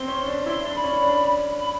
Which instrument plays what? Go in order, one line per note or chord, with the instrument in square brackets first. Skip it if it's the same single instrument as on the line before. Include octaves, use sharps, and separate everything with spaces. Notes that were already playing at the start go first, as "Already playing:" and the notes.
Already playing: [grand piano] C4 [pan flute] C6
[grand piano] C#4
D4
[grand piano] E4 [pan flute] C6
[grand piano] D4
[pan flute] B5
[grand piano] C#4
D4
[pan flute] B5